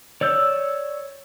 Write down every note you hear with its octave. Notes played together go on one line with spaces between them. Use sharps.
C#5 D5 E6 G6